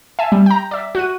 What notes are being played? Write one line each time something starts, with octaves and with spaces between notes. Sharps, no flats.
E5 G#5 A5
G3
G5 A#5
D5 E5
F#4 F#6 D#7